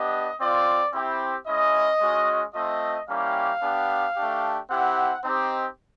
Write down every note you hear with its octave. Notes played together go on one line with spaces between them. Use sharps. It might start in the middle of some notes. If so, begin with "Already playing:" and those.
Already playing: B3 D4 G4 D#5
C4 F4 D5
C4 E4 G4
G#3 C#4 E4 D#5
G#3 C#4 F#4
A3 C4 F4 D#5
G3 A#3 C#4 E4 G4 F5
B3 D4 G4
A3 D4 G4
C4 E4 G4 F#5
C4 D#4 G4